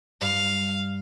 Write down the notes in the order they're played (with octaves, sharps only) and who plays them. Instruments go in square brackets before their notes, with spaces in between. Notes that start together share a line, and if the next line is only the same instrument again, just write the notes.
[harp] G2 [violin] F5